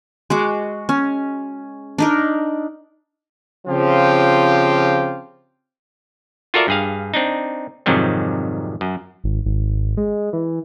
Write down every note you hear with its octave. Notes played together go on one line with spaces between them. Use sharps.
G#3 F#4 D6
C#4
D4 D#4 A#4
C#3 F3 C4 F4 G4
F4 F#4 A4 A#4 D5 E5
G2 G#4 F5
C4 D4 D#4
F2 G#2 C3 D#3 F#3 G3
F#2
G#1
G#1
G#3
E3